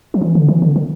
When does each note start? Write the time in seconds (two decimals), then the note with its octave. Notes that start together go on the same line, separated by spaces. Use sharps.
0.14 F3
0.21 E3
0.35 D3
0.48 E3
0.62 D3
0.76 D3